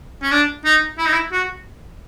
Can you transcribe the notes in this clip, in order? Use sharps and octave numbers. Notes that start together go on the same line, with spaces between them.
C#4
D4
D#4
E4
D#4
E4
F#4